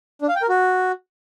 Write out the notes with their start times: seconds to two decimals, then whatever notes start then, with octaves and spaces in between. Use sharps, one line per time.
0.22 D4
0.28 F5
0.35 G5
0.42 A#4
0.49 F#4